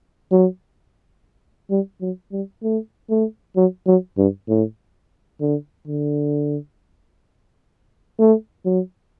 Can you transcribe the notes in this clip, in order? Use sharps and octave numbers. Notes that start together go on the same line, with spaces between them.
F#3
G3
F#3
G3
A3
A3
F#3
F#3
G2
A2
D3
D3
A3
F#3